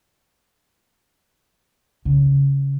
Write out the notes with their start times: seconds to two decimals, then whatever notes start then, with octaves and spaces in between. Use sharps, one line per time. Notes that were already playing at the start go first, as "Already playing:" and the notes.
2.05 C#3